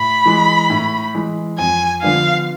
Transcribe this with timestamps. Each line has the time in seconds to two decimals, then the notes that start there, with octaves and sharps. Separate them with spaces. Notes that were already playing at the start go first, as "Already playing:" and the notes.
Already playing: A2 B5
0.26 E3 G#3
0.70 A2
1.14 E3 G#3
1.58 F2 G#5
2.02 D3 F3 B3 D4 F5